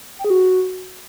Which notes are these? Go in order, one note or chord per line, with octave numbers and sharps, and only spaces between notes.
G5
G#4
F#4